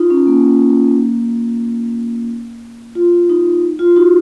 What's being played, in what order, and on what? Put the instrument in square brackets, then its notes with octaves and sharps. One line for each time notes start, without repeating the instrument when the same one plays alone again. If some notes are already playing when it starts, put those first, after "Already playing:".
Already playing: [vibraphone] D#4 F4
C#4
A#3
F4
D#4
F4
D#4 F#4